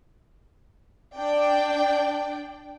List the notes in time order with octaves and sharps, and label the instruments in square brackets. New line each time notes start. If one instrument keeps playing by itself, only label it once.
[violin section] D4 D5 G5